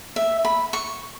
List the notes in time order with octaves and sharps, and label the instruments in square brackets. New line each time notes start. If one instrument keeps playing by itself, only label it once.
[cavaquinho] E5
B5
C#6